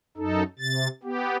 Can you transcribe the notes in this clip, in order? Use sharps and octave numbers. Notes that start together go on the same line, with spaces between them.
F#2 D#4 A4
C3 A6
B3 G4